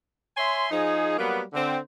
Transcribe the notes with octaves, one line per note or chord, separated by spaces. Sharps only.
C#5 E5 G#5 C6
F3 D#4 G#4
F#3 G3 A#3 B3
D3 C4